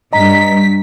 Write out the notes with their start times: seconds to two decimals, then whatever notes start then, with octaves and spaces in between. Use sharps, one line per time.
0.13 G2 D#5 A#5 B6